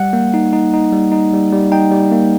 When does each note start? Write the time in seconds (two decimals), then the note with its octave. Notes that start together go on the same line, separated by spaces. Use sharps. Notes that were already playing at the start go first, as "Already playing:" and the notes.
Already playing: G3 F#5
0.13 A#3
0.34 D#4
0.53 D#4
0.74 D#4
0.92 G3
1.12 D#4
1.33 G3
1.52 G3
1.71 D#4 G5
1.91 G3
2.12 A#3